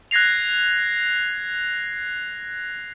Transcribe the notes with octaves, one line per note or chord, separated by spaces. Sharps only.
F#6 G#6 A#6 C7 F7